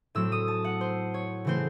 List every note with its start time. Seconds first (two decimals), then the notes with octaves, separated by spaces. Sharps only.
0.15 A2 F#3 C4 E6
0.32 D#6
0.48 A5
0.64 F#5
0.81 C5
1.14 C#5
1.45 C#3 E3 A3 C4 C5